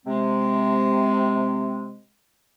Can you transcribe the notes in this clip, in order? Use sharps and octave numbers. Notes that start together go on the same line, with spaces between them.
C3 G#3 C4